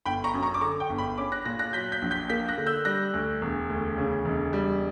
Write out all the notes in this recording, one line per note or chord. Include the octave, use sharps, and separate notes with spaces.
G1 G5 B5
A#5 C#6
F#2
A#5 C#6
D6
D3 A#5 C#6
G5
G1
G5 B5
C#4 B5 D6
F#6 A#6
A#2 F#6 A#6
F#6 A#6
F#3 G6 B6
G6 B6
A#1
G6 B6
A#3 G6 B6
F#6 A#6
D3
E6 G6
G3 F#6 A#6
D2
E1
D2
C#3
E1
G3